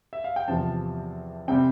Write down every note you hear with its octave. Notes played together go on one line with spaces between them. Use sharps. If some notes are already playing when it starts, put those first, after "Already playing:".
E5
F5
G5
E2 C3 F3 C4 A5
C3 G3 C4 G5